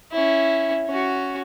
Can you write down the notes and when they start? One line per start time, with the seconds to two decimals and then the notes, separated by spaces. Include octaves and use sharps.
0.12 C#4 E4
0.86 C#4 F#4